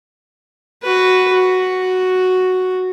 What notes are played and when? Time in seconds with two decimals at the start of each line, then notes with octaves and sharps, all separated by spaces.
0.83 F#4 B4
1.34 F#4